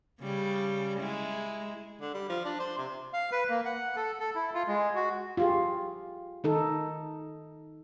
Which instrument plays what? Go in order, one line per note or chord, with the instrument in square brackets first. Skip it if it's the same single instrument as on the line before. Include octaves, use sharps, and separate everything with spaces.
[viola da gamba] C#3 G3
G#3 E4
[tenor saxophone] D3
G3
F3
D4
C5
C3
[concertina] F5
B4
A#3
F#5
A4
A4
E4
F4
G#3
F#4
[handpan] F4 G4 G#4
D#3 D#4 A4